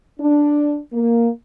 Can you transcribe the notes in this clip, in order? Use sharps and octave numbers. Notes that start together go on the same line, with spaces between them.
D4
A#3